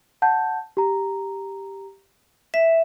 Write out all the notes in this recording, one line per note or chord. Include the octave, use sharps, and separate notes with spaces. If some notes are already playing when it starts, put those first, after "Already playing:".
F#5 A5 G6
G4 A#5
E5 B6